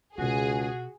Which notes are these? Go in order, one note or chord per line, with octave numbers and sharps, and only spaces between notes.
C#2 B2 F4 F#4 G#4